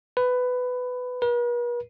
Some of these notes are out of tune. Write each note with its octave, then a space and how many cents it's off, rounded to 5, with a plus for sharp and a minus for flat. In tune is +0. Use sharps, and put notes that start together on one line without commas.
B4 +15
B4 -45